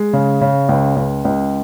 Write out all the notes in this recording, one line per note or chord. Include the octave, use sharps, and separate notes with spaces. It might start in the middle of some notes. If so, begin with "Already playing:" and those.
Already playing: G#3
C#3
C#3
C#2
C#2
C#2